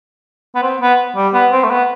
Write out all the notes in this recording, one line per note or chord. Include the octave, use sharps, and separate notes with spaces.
B3
C4
B3
G3
B3
C4
A3
B3